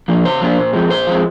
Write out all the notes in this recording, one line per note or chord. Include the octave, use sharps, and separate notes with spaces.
F3 A#3 D4
C#3 C5
F3 A#3 D4
A#2
F3 G#3 C4
A#2 C5
F3 G#3 C4